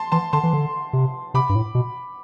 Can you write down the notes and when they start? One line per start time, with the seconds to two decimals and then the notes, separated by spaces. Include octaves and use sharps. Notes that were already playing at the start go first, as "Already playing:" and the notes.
Already playing: A5 C6
0.12 E3 A5 C6
0.33 D3 A5 C6
0.44 E3
0.53 D3
0.93 C3
1.34 C3 B5 D6
1.49 G2
1.55 A2
1.75 B2